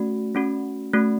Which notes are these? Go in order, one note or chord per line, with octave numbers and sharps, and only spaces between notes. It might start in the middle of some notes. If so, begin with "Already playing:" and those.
Already playing: A3 C#4 F#4
A3 C#4 F#4
A3 C#4 F#4